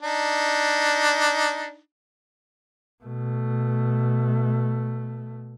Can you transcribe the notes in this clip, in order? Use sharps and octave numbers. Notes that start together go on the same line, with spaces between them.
D4 D#4
B2 A3